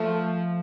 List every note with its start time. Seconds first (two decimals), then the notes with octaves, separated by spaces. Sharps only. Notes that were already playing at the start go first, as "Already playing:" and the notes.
Already playing: F3 A3